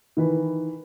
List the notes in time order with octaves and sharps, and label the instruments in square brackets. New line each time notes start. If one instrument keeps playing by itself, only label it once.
[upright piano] D#3 E3 B4